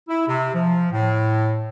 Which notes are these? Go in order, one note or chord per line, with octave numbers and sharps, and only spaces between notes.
E4
C3
F3
A2